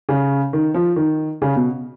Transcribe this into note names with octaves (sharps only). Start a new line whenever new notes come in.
C#3
D#3
F3
D#3
C#3
B2